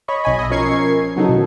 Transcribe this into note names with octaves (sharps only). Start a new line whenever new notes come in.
C#5 D#5 B5 C#6
B1 D#5 G#5 B5
D#5 E5
F3 C#4 A#4 C#6 G#6 C7
C#3 F#3 B3 D#4 E4 A4
B2 D#3